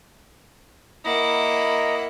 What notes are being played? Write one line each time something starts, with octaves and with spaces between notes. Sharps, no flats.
A#3 E4 D#5 F#5 A#5